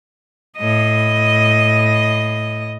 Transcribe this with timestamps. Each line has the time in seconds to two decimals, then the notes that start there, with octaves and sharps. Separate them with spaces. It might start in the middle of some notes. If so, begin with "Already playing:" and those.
0.58 A2 D#5